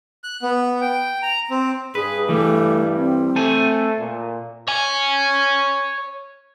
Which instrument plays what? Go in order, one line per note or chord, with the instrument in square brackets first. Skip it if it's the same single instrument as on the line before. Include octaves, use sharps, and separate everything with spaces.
[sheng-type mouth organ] F#6
B3
G5
A#5
C4
[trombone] G2 [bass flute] G#4 [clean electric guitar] B4
[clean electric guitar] E3 G3 [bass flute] A3
[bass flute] C4
[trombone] A3 [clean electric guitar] A4 C5 G#5
[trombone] A#2
[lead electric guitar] C#5 G#5